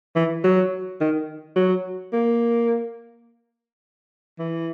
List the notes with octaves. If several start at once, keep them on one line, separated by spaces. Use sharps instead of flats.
E3
F#3
D#3
F#3
A#3
E3